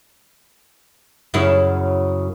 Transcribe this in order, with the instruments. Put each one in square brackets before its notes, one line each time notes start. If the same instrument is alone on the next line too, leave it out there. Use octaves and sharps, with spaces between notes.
[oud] F#2 C#3 E4